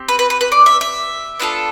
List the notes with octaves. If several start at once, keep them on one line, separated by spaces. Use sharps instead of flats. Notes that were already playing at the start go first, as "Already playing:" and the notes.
Already playing: C4 G4
B4
B4
B4
B4
D5
E5
E5
B3 D4 F4 A4